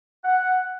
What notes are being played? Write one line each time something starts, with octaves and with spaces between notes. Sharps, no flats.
F#5